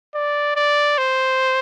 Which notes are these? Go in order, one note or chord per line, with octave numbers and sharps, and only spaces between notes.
D5
D5
C5